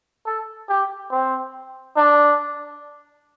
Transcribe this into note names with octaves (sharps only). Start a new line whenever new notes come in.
A4
G4
C4
D4